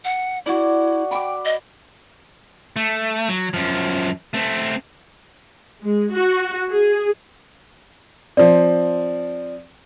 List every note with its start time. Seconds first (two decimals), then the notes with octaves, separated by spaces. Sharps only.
0.05 F#5
0.46 E4 F#4 D5
1.11 G5 B5 D6
1.45 D#5
2.76 A3
3.29 F#3
3.54 F#2 F3
4.34 A3 C4
5.82 G#3
6.12 F#4
6.70 G#4
8.37 F3 C4 D5